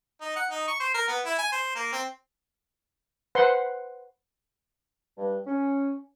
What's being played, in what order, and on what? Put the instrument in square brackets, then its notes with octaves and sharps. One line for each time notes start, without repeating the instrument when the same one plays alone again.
[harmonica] D#4
F#5
D#4
C#6
C5
A#4
B3
E4
G#5
C5
A#3
C4
[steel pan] B4 C5 F#5 C6
[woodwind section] G2
C#4